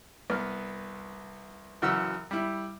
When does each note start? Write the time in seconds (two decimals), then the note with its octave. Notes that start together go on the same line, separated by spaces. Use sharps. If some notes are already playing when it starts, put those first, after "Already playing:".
0.30 C2 B3 F6
1.82 F#2 C#3 E3 F#3 F#5 E6
2.31 G3 E4